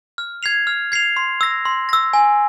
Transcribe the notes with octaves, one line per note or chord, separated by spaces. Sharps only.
F6
G#6 C7 F7
F6
G#6 C7 F7
C6
E6 A#6
C6
E6 A#6
G#5